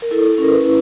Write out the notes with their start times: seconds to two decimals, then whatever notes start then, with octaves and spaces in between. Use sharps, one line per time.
0.02 A#4
0.11 E4 A4
0.38 C#4 A#4
0.51 B4
0.64 E4